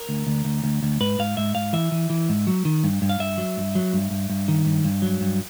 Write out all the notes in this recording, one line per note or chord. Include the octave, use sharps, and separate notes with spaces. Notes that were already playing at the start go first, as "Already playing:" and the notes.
Already playing: A#4
D2
D2
D2
D2
D2
G#2 B4
G#2 F5
G#2 E5
G#2 F5
E3 E5
E3
E3
G#2
F#3
D#3
G2
G2
F5
G2 E5
F#3
G2
F#3
G2
G2
G2
D#3
G2
G2
F#3
G2